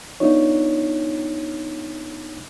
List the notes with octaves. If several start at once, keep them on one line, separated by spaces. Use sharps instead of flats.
B3 D4 D#4 F4 C#5